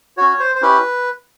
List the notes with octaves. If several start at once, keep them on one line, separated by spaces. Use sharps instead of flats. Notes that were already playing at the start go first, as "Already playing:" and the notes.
C#4 F#4 C#5
C5
C5
C#4 E4 G4 B4